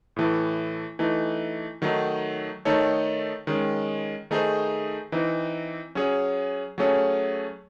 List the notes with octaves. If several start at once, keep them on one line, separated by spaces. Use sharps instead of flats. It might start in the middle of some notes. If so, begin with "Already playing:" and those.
A2 E3 A3
E3 A3 D#4
D#3 F#3 A3 D#4
D#3 A3 D#4 A4 C#5
D#3 G#3 C#4
D#3 A3 D#4 G#4 C5
E3 C4 D#4
F#3 C#4 G#4 C#5
F#3 A3 C#4 G#4 C#5